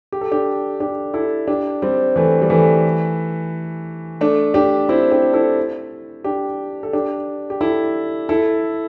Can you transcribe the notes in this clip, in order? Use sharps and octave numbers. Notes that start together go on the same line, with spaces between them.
G4
A4
D4 G4
D4 G4
E4 A4
D4 G4
G3 C4
E3 A3
G3
E3 A3
A3 D4
D4 G4
C4 E4
D4 G4
E4 A4
D4 G4
A4
D4 G4
G4
E4 A4
E4 A4